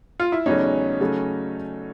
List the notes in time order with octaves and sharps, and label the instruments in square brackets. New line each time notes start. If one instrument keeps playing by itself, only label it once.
[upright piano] F4
E4
E2 C#3 F#3 A3 C#4 D#4
C#3 F#3 A3